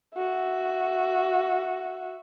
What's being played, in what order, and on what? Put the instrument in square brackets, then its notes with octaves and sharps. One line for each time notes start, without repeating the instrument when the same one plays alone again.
[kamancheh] F#4 E5